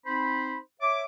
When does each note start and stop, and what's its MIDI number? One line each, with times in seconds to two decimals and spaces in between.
0.06 0.58 60
0.06 0.58 63
0.06 0.58 72
0.06 0.58 83
0.82 1.05 73
0.82 1.05 76
0.82 1.05 86